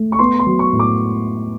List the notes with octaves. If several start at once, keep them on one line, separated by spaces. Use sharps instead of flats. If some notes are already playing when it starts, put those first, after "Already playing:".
Already playing: A3
C#6
B3 C6
C6
F#3
C#6
A2
D6